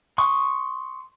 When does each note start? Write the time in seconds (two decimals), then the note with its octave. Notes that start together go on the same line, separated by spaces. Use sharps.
0.18 C6 C#6 D#6